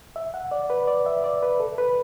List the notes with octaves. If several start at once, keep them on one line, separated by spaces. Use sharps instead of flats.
E5
F#5
D5
B4
D5
E5
D5
B4
A4
B4